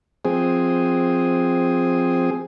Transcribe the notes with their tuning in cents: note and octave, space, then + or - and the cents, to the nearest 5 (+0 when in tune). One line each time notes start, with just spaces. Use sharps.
F3 +10 C4 +0 G#4 +0